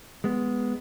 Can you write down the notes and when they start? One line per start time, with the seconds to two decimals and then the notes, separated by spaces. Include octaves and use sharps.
0.24 G#3 B3